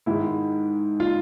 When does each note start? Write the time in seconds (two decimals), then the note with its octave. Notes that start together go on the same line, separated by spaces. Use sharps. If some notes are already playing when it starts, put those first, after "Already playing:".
0.06 G#2 D#3 G#3 E4
1.00 F4